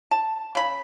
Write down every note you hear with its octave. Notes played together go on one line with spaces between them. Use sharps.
A5
C#3 B5